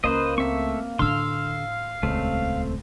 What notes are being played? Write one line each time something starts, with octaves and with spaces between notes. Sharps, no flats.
C#2 A#3 B4 C5 D#5
A3 C4 E5 C#6
A2 D3 D4 F5 C6 E6
D#1 C#2 A3 C4